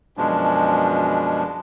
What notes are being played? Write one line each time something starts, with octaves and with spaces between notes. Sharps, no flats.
F#2 B2 F3 G#3 D4